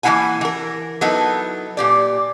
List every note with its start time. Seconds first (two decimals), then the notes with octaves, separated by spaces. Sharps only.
0.03 E3 A#3 D4 E4 F#5 G#5
0.41 E3 A#4
1.01 F#3 B3 D#4 E4 A4
1.77 A#2 G4 D5